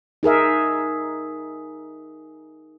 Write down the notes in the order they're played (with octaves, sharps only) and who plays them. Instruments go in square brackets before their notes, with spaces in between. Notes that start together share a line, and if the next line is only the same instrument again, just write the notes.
[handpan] D#4 G#4 A#4 E5